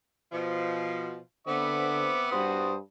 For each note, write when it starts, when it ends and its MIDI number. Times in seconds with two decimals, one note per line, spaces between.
0.32 1.16 47
0.32 1.16 53
1.47 2.15 50
1.47 2.67 59
1.47 2.67 60
1.47 2.32 76
1.47 2.32 86
2.32 2.80 43
2.32 2.74 66
2.32 2.74 72
2.32 2.74 87